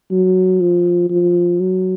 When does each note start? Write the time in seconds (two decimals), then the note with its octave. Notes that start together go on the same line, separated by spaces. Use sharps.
0.11 F#3
0.61 F3
1.10 F3
1.60 F#3